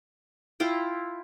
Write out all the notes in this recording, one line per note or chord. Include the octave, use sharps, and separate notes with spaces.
E4 F4 G5